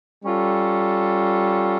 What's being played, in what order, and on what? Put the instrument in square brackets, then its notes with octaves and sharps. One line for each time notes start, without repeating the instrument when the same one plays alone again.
[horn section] G3 C#4 F4 A4